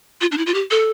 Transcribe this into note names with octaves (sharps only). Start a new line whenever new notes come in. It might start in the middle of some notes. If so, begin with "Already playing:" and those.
F4
D4
E4
F4
G4
A4